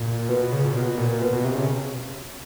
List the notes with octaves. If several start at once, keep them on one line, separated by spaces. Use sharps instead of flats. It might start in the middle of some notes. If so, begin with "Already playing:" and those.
Already playing: A#2
B2
C#3
A#2
B2
A#2
B2
B2
C3
C#3